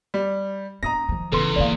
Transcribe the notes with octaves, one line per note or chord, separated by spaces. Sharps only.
G3
B3 D4 A#5 D#6 A#6
D#3 F3
G1 E2 C#3 A4 B4 C6
D3 A#3 D5 F5